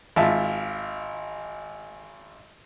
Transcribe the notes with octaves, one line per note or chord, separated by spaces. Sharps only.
G#1 F4 E5 A5